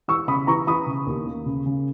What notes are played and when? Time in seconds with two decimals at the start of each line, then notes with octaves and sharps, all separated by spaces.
0.08 E3 C#6 E6
0.28 C#3 B5 D#6
0.47 E3 A#5 C#6
0.67 E3 B5 D#6
0.87 C#3
1.07 D#2
1.26 A#3
1.46 C#3
1.66 C#3